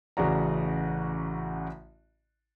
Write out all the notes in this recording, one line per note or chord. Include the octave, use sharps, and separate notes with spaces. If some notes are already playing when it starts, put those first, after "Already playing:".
A1 C#3 F#4 D5 A#5